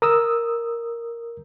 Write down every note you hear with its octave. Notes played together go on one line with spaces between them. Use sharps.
A#4 D#6 E6